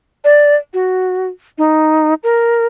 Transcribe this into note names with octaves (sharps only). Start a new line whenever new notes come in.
D5
F#4
D#4
A#4